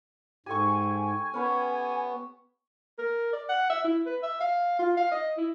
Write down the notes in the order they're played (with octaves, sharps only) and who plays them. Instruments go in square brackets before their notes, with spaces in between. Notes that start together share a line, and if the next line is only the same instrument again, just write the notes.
[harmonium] G#2 [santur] G4 A4 C#6 [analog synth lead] G#5
[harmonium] B3 [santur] C#4 B4 C#5
[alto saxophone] A#4
D5
F#5
E5
E4
B4
E5
F5
F4
F5
D#5
E4